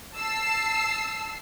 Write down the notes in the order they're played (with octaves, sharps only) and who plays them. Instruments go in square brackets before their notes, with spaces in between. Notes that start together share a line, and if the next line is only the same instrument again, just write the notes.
[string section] A5 E6 C7